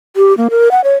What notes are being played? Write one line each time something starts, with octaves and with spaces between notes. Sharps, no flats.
G4
A#3
A#4
F#5
C#5